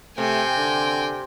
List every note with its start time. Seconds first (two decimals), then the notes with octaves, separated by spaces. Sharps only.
0.18 C3 A3 G5 G#5
0.57 D3